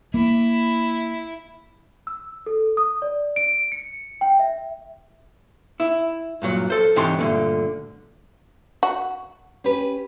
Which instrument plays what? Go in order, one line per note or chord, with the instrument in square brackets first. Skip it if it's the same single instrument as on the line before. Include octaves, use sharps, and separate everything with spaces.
[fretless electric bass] A#3 [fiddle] E4
[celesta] E6
A4
D#6
D5
D7
C#7
G5
E5
[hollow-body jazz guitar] E4
G2 A#2 F#3
A4 C5
G#2 C3 E3 C#5 C6
D2 G2 A#2 D3
[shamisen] F#4
[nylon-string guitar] C#4 G4 B4